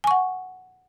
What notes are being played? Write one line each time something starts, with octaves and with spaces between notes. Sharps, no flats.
F#5 G#5 C#6